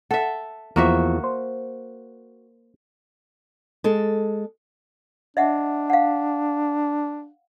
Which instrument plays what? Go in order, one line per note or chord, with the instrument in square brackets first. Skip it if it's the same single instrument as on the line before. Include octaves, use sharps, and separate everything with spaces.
[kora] A4 E5 [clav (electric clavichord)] F#5
[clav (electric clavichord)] E2 F3 [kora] A#3 F#4 E5
[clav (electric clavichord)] C5
[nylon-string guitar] G#3 A4
[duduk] D4 [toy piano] D#5 E5 F#5
[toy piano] F5 F#5